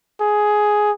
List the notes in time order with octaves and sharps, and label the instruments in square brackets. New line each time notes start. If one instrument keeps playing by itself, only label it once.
[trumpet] G#4